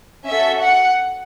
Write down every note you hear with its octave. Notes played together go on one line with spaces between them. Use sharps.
C#4 F#4 A4 E5
F#5